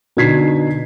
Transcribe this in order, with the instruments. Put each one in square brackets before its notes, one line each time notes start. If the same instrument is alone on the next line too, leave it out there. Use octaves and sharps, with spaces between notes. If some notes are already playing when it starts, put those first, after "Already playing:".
[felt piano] B2 D3 D#4 G#6 B6 C7